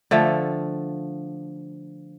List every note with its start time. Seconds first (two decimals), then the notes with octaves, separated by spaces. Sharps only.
0.11 D3 F3 A3